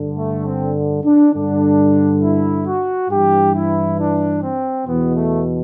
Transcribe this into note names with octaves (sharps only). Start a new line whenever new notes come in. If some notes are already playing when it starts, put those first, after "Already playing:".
Already playing: G2 D3
A3
C4
D4
G2 D3 D4
E4
F#4
G2 E3 G4
E4
D4
C4
E2 B2 B3
A3